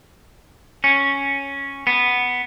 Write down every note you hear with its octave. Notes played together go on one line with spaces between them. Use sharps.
C#4
B3